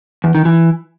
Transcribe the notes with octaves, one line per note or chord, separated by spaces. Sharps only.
E2
D#3
E3